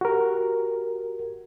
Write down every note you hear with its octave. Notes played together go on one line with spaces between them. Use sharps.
F#4 G4 A#4